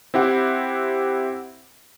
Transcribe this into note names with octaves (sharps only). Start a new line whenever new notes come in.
C4 E4 G4 F#5